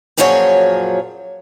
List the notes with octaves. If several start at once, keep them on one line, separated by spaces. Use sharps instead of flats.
F#2 A#2 F3 F#3 G#4 C#5